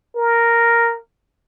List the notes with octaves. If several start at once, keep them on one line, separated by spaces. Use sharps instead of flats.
A#4